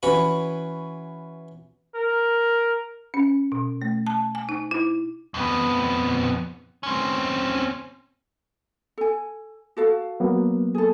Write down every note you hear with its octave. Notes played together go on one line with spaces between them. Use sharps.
E3 C#4 F#4 B5
A#4
C#4
B2
A3
A5
G#5
D#4
E4
F2 B3
C4 C#4
A4 G#5
F#4 A4 F5
F#3 A#3 B3
G#4 A4